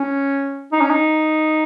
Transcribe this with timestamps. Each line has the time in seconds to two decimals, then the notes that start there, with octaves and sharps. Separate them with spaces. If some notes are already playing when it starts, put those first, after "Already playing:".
Already playing: C#4
0.72 D#4
0.81 C#4
0.90 D#4